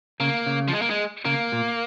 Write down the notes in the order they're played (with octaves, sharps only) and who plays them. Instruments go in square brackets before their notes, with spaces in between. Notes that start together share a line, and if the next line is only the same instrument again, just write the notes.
[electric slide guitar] C#3 [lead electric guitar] A#3
[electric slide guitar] C#3
[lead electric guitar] F3
G#3
A#3
G#3
[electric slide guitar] C#3 [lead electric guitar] A#3
[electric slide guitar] A#2